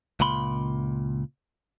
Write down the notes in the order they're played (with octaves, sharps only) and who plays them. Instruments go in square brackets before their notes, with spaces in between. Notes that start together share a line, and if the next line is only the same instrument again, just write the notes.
[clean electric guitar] C#2 A#2 C#3 B5 C6